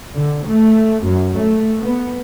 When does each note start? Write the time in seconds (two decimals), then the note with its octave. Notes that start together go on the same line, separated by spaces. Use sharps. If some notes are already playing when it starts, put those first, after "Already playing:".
0.15 D3
0.46 A3
1.04 F#2
1.38 A3
1.82 B3